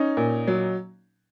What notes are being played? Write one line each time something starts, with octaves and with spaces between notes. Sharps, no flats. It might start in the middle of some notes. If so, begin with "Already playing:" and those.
Already playing: C#4 D#4
A#2
F#3